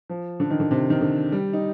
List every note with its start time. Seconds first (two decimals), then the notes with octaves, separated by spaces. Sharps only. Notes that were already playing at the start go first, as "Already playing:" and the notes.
0.09 F3
0.40 D3
0.50 D#3
0.60 D3
0.71 C3
0.90 D#3
1.01 D3
1.32 G3
1.53 D#4